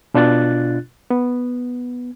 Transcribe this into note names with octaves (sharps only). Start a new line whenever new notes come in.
B2 D4 F4 F#6 A6
B3